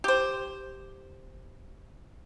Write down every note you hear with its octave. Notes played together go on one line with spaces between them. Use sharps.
G4 C5